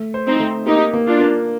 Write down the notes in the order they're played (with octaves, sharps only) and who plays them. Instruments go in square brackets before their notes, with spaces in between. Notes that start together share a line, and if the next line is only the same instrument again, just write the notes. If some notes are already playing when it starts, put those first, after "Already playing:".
Already playing: [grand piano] A3
C5
[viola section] C4 D#4
[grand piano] A3
[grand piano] A#3 [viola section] D#4 G4
[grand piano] A#3
[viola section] D4 F4
[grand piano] A#3